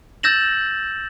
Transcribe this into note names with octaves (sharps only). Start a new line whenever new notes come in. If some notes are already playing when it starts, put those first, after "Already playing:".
E6 G6 A6 A#6 E7 F#7